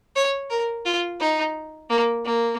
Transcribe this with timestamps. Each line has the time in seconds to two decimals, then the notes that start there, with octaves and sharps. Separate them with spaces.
0.16 C#5
0.50 A#4
0.85 F4
1.20 D#4
1.89 A#3
2.25 A#3